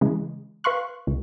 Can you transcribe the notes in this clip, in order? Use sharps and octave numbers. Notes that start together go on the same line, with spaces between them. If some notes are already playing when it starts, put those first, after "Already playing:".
C#3 E3 G#3
B4 F5 C6 C#6 F#6
C#2